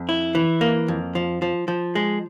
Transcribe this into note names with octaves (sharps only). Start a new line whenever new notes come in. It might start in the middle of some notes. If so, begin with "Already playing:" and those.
Already playing: F2
E4
E3
A#3
F2
F3
F3
F3
G#3